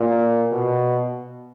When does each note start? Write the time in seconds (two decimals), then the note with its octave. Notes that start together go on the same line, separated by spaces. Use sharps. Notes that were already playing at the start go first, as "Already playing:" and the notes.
Already playing: A#2
0.52 B2